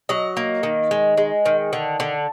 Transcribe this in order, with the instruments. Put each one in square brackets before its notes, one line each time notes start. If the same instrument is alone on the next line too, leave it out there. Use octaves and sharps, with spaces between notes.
[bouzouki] F#3 D#5
A#3
D#3
G#3
G#3
D#3
D3
D3